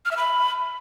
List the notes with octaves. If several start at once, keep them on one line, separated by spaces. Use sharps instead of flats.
F6
E5
B5